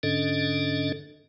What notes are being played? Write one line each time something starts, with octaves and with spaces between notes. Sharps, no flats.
G#2 D3 C#4 D4 A4 D#5